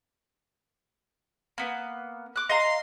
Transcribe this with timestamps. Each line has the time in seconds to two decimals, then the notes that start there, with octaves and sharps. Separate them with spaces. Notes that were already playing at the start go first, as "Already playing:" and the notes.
1.58 A#3 B3
2.36 D6 F#6
2.49 D#5 F5 A#5 C6